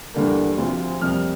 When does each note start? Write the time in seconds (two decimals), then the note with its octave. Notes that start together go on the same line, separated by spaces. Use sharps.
0.14 E2 D3 G3 A#3
0.58 D2 C3 F3
1.01 F2 C3 G3 A#3 F6